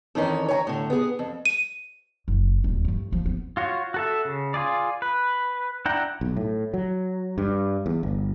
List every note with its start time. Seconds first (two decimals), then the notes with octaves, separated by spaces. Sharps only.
0.15 F2 D#3 E3 C#4
0.48 C#5 G#5 A#5
0.67 A2 D3
0.90 B3 G#4
1.19 F2
1.45 D#7
2.28 F#1
2.64 D#1 D2
2.85 G2 A3
3.12 F3
3.26 B3
3.57 F4 F#4 C#5
3.94 F#4 A4 E5
4.25 C#3
4.54 F4 G#4 D5
5.02 B4
5.86 D4 E4 F#5 G5 A#5
6.21 B1
6.37 A2
6.74 F#3
7.38 G2
7.86 E2
8.03 G1